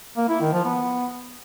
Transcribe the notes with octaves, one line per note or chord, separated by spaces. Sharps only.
A#3
E4
D#3
F3
B3